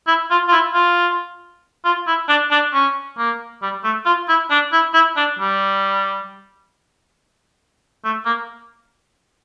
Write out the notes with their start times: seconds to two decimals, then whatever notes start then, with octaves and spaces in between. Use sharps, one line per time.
0.07 E4
0.30 F4
0.48 F4
0.52 E4
0.74 F4
1.85 F4
2.07 E4
2.28 D4
2.51 D4
2.73 C#4
3.18 A#3
3.62 G3
3.84 A3
4.06 F4
4.28 E4
4.51 D4
4.73 E4
4.94 E4
5.17 D4
5.39 G3
8.05 A3
8.26 A#3